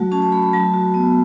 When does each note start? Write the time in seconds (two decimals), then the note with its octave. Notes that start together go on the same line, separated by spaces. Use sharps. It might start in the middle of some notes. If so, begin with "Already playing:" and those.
Already playing: F#3 A3 F#4
0.12 C#4 A5
0.22 A5
0.32 A3 B5
0.43 B5
0.53 F#3 A5
0.74 F#4
0.94 B3